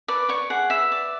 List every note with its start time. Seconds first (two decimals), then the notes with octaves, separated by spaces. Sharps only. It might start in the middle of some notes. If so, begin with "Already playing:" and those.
0.08 B4 D5 D6
0.28 C#5 D5 C#6
0.50 G#4 F#5
0.70 B4 E5
0.92 D5